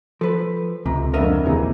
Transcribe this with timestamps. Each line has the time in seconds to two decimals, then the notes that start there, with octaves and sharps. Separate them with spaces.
0.21 F3 A4 B4
0.86 C#2 C3 A#5
1.14 F2 D3 A#4 D#5 E5
1.46 D#2 C3 E3 E4 G#4 A#5